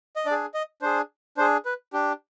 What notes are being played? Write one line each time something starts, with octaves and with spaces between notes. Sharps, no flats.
D#5
D4 D5
G#4
D#5
D4 G#4 C5
D4 G#4 C5
B4
D4 G4